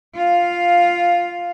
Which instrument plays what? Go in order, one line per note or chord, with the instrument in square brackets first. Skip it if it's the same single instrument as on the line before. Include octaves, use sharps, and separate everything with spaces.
[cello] F4 F5